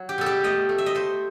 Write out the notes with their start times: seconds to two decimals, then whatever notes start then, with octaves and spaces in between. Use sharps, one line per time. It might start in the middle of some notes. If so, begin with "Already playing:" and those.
Already playing: F#3
0.09 G4
0.18 B2 A4
0.26 G4
0.44 A3 D#5
0.69 A3
0.78 E5
0.86 D#5
0.95 A3 C5